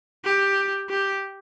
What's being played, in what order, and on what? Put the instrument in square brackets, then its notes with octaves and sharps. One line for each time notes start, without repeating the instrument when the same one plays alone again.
[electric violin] G4
G4